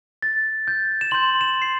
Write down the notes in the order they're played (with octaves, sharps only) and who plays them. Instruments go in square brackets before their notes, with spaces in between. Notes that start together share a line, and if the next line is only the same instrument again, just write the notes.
[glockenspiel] A6
G6
E7
C6 G6 F#7
E7
C7